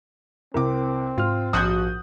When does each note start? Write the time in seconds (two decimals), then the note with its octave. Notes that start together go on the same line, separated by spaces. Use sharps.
0.54 C2 C3 C4 E4 A#4 D6
1.18 G#2 F4 F6
1.53 A#1 F3 F#4 D#6 F#6 G6